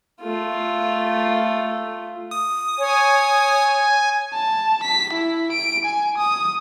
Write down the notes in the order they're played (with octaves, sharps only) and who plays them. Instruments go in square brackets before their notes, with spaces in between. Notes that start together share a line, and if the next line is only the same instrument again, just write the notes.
[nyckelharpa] A3 F4
[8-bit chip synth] D#6
[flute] C#5 [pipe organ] G#5
[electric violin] A5
B6
E4
D7
G#5
D#6